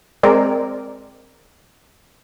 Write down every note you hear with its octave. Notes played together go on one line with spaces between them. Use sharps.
G#3 C4 A#4 D5